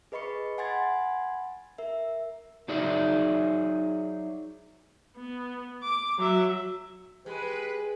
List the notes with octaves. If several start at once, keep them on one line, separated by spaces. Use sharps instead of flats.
G#4 B4 D#5 B5 C#6 C#7
F#5 G#5 B5 C6 G#6 A6
A#4 E5
F#3 D#4 G#4 D5 E5
B3
D6
F#3 E5
G#3 G4 B4